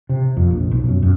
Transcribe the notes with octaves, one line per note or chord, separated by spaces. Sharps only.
C3
F2
A#1
B1
F#2
F#2